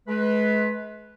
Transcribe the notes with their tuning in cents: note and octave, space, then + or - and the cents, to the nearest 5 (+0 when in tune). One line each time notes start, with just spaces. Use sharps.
G#3 +40 B4 +0